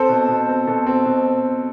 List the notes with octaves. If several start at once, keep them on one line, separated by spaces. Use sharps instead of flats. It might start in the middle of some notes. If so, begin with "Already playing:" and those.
Already playing: C4 A4 C5
B2
B2
C4
B2 A4
C4
B2